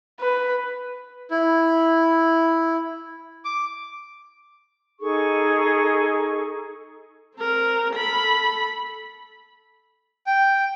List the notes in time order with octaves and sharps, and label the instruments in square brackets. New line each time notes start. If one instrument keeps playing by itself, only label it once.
[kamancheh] B4
[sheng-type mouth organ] E4
D6
[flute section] D#4 G#4 A4 C#6
[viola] C4 A#4
A4 B5
[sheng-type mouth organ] G5